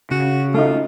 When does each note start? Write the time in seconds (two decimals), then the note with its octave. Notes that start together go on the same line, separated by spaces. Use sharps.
0.11 C#3 F#4
0.54 A3 D#4 F4